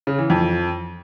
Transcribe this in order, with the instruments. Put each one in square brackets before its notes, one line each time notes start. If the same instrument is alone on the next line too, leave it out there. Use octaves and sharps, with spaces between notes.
[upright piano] C#3
E3
F2